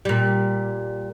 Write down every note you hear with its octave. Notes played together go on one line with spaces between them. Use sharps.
A#2 G3